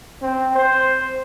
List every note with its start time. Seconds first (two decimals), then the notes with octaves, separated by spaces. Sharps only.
0.22 C4
0.56 C5